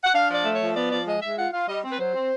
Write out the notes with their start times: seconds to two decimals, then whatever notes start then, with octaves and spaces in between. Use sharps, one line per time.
0.04 F#5
0.14 D4 F5
0.29 F3
0.34 D5
0.45 A3
0.55 C#5
0.61 F3
0.76 B3 D5
0.91 F3 D5
1.06 G#3 D#5
1.22 G#3 E5
1.37 F4 F#5
1.53 F4 F5
1.68 G3 D#5
1.84 C4
1.91 B4
1.99 F#3 C5
2.14 C4